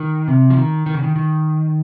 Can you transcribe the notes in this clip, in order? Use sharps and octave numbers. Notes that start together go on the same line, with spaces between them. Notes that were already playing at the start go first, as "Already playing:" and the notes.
Already playing: D#3
C3
F3
D#3
D#3
C#3
D#3
D#3